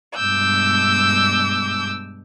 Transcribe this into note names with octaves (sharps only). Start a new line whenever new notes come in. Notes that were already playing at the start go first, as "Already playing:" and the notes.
G2 B2 G#3 D6 E6 G6